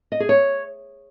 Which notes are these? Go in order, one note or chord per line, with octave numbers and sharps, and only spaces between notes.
D#5
G#4
C#5